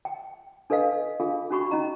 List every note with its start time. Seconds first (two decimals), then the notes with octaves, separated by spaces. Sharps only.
0.05 G5
0.70 D4 A4 B4 D#5 F5
1.20 D4 F4 G#4 A4 F5
1.50 C#4 D4 F#4 B5 C#6
1.71 C#4 D#4 D#5 A#5